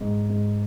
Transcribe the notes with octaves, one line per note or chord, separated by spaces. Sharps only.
G#2
G#2